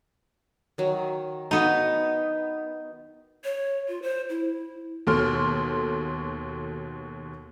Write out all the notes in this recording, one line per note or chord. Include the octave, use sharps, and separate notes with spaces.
D#3 F#3
B3 D#4 F#4
C#5
F4
C5
E4
D#2 B2 A4 C6 F6